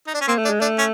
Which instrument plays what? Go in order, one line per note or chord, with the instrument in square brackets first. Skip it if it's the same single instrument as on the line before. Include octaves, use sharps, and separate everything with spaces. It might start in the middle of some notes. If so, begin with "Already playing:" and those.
[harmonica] D#4
D4
C#4
[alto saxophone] A#3 [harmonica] C4
[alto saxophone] A3
[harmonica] D4
[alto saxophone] G#3
[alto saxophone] A3 [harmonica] D4
[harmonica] C#4